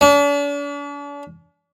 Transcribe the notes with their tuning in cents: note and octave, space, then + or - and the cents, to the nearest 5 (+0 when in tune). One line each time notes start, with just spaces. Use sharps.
D4 -45